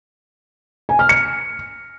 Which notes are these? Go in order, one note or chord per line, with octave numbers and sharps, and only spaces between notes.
G#5
F6
C#7